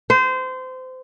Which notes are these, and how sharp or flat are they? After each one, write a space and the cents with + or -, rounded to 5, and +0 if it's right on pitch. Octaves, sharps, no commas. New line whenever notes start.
C5 -25